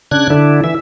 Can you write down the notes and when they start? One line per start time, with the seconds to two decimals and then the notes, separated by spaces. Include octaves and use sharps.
0.11 C#3 D4 F#6 G#6
0.30 D3 D4 E4
0.64 E3 E5